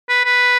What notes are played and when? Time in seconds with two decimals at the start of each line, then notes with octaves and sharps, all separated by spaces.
0.09 B4
0.25 B4